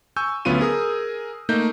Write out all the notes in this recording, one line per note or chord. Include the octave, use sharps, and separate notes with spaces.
G#5 C#6 E6 G6
D2 F#3 B3 C#4 F4 D#7
G#4 A#4 D#6
A3 A#3 D#4 G6